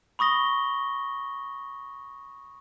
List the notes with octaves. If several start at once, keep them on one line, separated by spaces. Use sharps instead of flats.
B5 C#6 D#6 A#6 G7